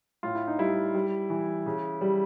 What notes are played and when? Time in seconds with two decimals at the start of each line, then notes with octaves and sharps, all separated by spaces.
0.23 A2 F4
0.35 E4
0.47 D#4
0.59 G3 E4
0.94 G3
1.30 E3
1.66 C#3
2.01 G3